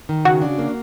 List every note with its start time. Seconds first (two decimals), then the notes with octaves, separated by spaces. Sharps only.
0.09 D#3
0.25 C#3 F#4
0.42 D4
0.59 A#3